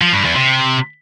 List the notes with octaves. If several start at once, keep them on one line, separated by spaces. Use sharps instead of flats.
F3
G2
E2
C3